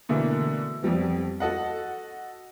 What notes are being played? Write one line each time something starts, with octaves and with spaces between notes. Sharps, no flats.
B2 D3 E3 A3 A#3
F2 F3 G3 B3
F#4 A4 D#5 F#5